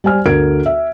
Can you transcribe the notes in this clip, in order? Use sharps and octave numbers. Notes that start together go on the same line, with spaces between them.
G3 C5 G#5 F6
D2 A4 A#4 G#6 D7
E5